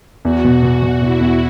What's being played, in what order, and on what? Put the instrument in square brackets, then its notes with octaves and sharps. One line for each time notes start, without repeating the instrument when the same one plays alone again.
[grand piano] E2 [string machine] F#4
[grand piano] B2
B2
B2
[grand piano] B2 [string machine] E4
[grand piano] E2